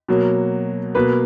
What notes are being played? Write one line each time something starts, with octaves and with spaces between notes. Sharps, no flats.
B2 F#3 A#3
B2 A#3 B4